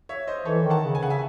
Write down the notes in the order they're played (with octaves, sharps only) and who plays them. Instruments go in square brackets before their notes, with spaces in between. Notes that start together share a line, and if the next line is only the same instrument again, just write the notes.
[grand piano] C#5 E5
C5 D#5
[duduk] E3 [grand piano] A4 C#5
[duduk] D#3
[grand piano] F#5 A5
[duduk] C#3
[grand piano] G#5
[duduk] C#3 [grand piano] F#5
[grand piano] E5 G#5